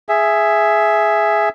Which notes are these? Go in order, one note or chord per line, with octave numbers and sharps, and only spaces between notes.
G#4 E5